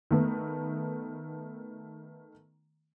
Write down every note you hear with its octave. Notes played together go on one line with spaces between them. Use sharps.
D#3 A3 B3